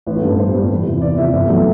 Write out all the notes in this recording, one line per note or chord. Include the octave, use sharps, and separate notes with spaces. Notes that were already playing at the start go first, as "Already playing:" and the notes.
A1 B4
A4
G2 D3 G3
B4
A1 C5
G2 D3 G3
E2
C3 E3
E2 D5
C3 E3 E5
G1 E5
F#3 A3